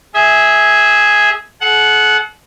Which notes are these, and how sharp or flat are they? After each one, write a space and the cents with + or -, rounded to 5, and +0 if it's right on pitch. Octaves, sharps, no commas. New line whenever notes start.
G#4 +0 E5 -20
A4 -45 F#5 +0